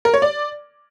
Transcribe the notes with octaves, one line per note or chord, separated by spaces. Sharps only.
A#4
C#5
D5